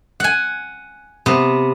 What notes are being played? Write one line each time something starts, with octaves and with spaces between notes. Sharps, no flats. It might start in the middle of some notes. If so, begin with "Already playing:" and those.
F#5 G#5
C3 B3